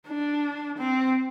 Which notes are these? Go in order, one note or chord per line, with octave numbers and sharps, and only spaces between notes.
D4
C4